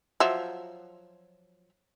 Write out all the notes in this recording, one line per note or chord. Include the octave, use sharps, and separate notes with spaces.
F3 F#3 E5